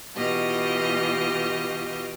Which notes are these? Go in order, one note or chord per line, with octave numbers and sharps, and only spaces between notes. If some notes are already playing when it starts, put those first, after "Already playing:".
B2 E3 F4 G4 D#5 F6